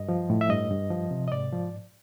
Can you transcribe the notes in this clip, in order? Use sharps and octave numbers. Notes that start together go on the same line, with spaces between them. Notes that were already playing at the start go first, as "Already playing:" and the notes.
Already playing: G2 D#5
F3
A2
E5
G2 D#5
G2
F3
C3
D#5
G#2 D5
F3